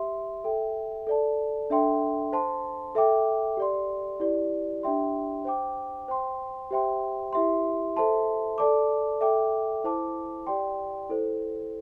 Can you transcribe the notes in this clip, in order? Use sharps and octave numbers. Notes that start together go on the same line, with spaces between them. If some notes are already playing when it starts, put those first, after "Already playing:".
Already playing: G4 E5 C6
A4 E5 G5
A4 D5 A5
D4 A4 E5 G5 C6
C5 A5 C6
A4 E5 G5 D6
G4 D5 C6
E4 G4 D5
D4 G4 E5 G5 C6
C5 G5 D6
C5 G5 C6
G4 C5 E5 G5 C6
E4 G4 E5 C6
A4 C5 E5 A5 C6
A4 D5 A5 D6
A4 E5 G5 D6
E4 C5 A5 D6
G4 D5 G5 C6
E4 A4 C5